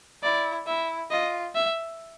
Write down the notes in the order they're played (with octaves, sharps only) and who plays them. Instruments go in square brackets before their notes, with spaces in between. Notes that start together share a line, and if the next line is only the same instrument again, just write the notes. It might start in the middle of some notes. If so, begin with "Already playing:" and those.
[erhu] E4 [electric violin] D5
[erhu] E4 [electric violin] E5
[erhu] F4 [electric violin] D#5
[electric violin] E5